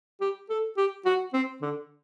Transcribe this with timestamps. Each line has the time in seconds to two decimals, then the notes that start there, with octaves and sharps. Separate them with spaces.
0.21 G4
0.50 A4
0.77 G4
1.05 F#4
1.33 C4
1.62 D3